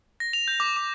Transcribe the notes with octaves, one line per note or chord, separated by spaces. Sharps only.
A#6
F7
G6
D6
D6